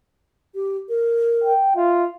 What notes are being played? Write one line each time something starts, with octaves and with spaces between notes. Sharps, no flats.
G4
A#4
G5
F4 E5